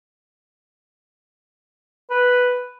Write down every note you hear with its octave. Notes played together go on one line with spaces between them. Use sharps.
B4